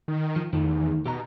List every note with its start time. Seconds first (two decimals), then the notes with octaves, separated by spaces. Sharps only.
0.08 D#3
0.36 F3
0.53 F2 D#3 A3
0.64 E2
1.06 B2 G4 D#5 A#5